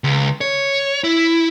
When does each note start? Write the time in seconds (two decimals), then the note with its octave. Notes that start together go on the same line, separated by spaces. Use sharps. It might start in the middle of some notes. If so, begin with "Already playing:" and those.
0.04 C#2
0.41 C#5
1.04 E4